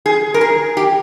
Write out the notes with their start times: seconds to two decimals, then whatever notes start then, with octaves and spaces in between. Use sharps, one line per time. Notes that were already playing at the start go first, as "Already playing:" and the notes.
0.06 G#4
0.34 A#4
0.41 G#4
0.77 G4